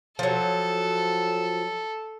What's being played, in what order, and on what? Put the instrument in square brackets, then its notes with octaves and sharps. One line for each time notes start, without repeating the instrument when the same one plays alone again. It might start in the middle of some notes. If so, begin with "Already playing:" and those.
[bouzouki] F3 F#3 [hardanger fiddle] A4